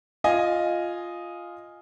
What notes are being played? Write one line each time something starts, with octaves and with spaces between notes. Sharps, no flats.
F4 D#5 G#5